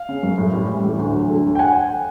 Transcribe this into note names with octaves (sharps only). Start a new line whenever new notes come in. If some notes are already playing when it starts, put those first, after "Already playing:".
Already playing: F5
C#3
F#2
A2
G3
E3
A2
D2
F#3
D3
D2
G5
F#5 G#5